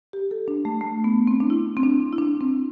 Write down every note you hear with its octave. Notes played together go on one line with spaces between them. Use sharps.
G4
A4
D4
A3
A3
B3
C4
D4
E4
C4
D4
E4
D4
C4